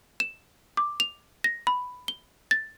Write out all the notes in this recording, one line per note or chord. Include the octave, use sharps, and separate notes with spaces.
E7
D6
F7
A#6
B5
G7
A6